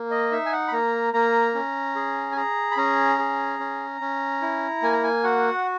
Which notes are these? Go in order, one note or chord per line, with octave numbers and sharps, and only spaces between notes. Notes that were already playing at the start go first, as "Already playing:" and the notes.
Already playing: A#3
D#5
D#4 E5
G#5
F#5
B5
A#3 A#5
A#3 A#5
C#4
G#4
G#5
G#4 A#5
B5
C#4 A#5
G#4
C#4
C#4
E4
A#3 G#5
A#5
G#5
F#4 F#5